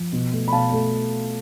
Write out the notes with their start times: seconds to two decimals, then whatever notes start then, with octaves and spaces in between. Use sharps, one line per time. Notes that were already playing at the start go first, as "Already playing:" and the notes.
Already playing: F3
0.13 B2
0.33 A3
0.48 B5
0.52 B2 F5 A5
0.72 A3